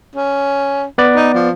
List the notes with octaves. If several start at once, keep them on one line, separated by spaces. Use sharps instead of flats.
C#4
B3 B4 D5
D#4
F3